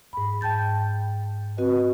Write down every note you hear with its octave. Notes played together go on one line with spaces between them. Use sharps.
G#2 B5
G5 A5 G6 A6
C4 F#4 B4 D#5